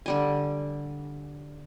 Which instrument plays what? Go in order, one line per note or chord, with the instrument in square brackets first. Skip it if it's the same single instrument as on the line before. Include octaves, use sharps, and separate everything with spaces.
[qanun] D3 G3 G#5